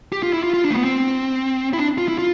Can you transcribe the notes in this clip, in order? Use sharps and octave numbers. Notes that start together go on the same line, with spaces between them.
G4
F4
E4
F4
F4
D4
A3
B3
C4
E4
D4
F4
E4
F4